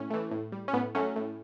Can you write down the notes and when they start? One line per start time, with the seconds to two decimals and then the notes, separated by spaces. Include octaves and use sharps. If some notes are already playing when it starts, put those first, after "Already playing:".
Already playing: A2 C#4
0.10 E3 A3
0.31 A2
0.52 G3
0.68 C#4
0.73 A2 B3
0.95 F#3 A3 C#4
1.16 A2